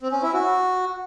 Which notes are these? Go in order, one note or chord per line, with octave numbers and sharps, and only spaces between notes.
C4
C#4
E4
F#4